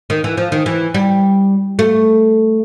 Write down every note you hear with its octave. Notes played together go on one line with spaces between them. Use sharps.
D#3
E3
F3
D#3
E3
G3
A3